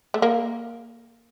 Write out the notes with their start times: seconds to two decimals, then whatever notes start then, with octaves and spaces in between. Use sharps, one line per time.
0.14 A3
0.22 A#3